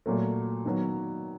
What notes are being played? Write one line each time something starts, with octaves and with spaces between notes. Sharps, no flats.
A#2 F#3 A3
D#3 F#3 B3